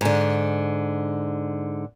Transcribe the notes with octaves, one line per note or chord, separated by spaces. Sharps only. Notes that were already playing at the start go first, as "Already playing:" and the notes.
G#2 D3